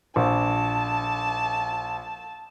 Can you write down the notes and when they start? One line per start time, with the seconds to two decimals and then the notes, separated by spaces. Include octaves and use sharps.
0.16 A#1 A5